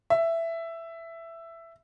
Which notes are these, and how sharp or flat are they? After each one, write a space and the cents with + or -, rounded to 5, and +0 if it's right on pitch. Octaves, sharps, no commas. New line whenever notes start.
E5 +10